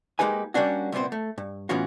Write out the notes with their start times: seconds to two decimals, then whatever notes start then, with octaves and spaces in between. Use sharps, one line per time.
0.19 G#3 A#3 D#4 G4 B4 G#5
0.54 G3 A#3 C#4 D4 F#4
0.92 C2 A#2 B3 C4 C5
1.12 A3
1.38 G2
1.69 A2 E3 B3 C#4 F4 F#4